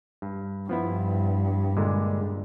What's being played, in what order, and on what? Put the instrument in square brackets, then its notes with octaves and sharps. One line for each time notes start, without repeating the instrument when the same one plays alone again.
[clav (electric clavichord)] G2
[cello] G2 [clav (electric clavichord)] F3 B3 E4
[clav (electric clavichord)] A#2 D3 G#3